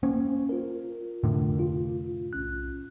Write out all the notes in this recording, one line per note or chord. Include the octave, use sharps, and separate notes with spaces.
A#3 C#4 C5
F4 A#4
F1 A2 D3
F4
B1 C#4 F#6